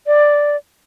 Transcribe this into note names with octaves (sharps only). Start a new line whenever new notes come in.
D5